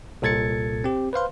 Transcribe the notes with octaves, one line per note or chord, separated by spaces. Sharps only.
C2 A#2 A4 G#6 A6 C#7
C4 G4
B4 C5 F5 C6